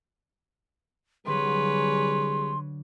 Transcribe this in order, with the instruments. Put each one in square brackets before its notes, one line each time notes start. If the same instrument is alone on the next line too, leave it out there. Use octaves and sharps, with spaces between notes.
[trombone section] C2 G3 G#4 [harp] D3 F#3 [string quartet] B4 C#5 [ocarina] C6